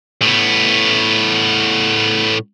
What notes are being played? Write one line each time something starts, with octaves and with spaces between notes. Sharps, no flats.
A2 B3